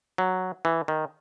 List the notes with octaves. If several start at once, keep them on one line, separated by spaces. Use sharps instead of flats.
F#3
E3
D#3